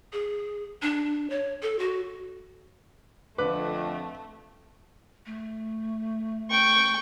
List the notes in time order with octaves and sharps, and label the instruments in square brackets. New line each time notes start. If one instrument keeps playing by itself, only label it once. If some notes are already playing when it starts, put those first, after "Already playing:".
[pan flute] G#4
D4
C#5
A4
F#4
[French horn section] F2 [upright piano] D3 D6 [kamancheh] A3 [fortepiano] B4
[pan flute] A3
[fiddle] G5 C#6